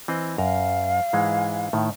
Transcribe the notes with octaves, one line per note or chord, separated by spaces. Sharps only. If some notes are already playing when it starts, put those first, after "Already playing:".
E3 C4 D#5
F#2 F5 A#5
G#2 E3 G#3
A2 D#3